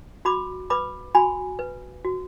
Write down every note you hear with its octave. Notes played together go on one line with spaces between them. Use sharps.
F#4 B5 D6
B4 B5 D6
F#4 G#5 B5
B4
F#4